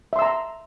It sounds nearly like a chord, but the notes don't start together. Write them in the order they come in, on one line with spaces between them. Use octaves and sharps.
E5 C6 E6 A#5